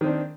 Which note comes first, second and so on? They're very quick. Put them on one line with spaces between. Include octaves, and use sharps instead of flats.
D#3 C4 D4